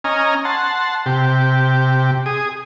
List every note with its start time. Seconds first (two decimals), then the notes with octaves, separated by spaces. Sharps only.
0.04 C#4 D#5 G#5 A#5 F6
0.45 F#5 A5 C6
1.06 C3 G4
2.26 G#4 D#6